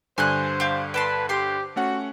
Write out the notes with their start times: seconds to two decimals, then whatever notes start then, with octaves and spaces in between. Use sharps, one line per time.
0.18 G2 D3 C5 G#5 C6 F#6
0.60 G4 F5
0.94 B4 G5 A5 C6
1.29 G4 C5 C6
1.76 A3 C#4 F#4 F#5